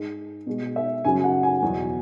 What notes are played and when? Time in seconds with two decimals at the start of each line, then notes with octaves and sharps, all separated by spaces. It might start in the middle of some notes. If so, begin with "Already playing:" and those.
Already playing: G#2 G#3
0.47 B2 G#3
0.76 E5
1.04 F#2 C#3 F#3 G#5
1.24 F#5
1.43 G#5
1.62 E2 B2 F#3